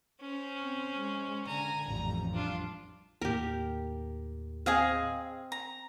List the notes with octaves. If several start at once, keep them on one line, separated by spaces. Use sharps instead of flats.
C#4 C5
C4
G#3
D3 G#5 A#5
A1 F2 G3 A#5
D4 F4
D#2 A2 G4 A#4
C4 G#4 D#5 F5
A#5